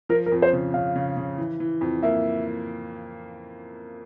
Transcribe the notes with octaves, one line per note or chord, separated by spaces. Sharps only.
F3 A#4
A#4
F2
C5
C#3
C#3 F5
C#3
C#3
E3
E3
F2
A#3 E5